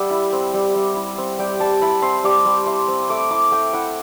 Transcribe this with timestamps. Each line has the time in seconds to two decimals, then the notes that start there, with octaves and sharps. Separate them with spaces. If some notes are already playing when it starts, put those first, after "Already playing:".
Already playing: G3 E5 F#5
0.10 E4
0.33 C4
0.53 G3
0.75 G3
0.96 E4
1.18 C4
1.39 G3 G5
1.60 G3 A5
1.81 E4 B5
2.02 C4 C6
2.24 G3 D6
2.45 G3
2.66 E4 C6
2.88 C4
3.09 A3 D6
3.31 E4 D6
3.52 A3 G5
3.73 E4 F#5